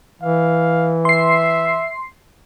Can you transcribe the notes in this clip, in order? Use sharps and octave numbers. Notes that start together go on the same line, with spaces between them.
E3 F5
E5 C6 C7